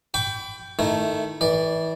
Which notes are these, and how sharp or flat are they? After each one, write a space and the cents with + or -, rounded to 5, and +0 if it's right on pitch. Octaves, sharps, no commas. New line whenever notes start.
G5 +0 B5 +25 D6 -45
D#3 +0 A3 +0 E4 +20
E3 -30 D5 +0